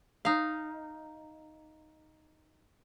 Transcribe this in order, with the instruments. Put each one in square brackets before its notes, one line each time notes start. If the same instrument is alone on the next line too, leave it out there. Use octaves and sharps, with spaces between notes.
[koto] D#4 F5